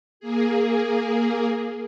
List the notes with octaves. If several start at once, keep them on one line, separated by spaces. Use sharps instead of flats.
A#3 G#4